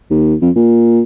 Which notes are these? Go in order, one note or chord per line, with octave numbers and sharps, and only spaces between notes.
D#2
F2
A#2